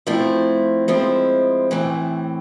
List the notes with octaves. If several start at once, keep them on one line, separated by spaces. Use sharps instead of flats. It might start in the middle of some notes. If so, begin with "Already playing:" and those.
F3 A3 C4 E4
F3 G#3 C4 E4
A2 E3 A3 C4